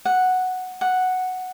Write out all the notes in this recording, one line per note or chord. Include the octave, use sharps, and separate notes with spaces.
F#5
F#5